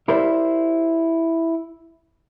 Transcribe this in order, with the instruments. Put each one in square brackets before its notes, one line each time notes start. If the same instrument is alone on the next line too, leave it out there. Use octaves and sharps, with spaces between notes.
[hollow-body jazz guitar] E4 G4 A#4 C5 D5 E5